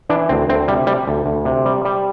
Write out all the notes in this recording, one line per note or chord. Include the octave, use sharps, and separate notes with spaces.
E3 D4
D2 C4
D2 C4
C3 G3
G3
D2
D2
C3
G3
G3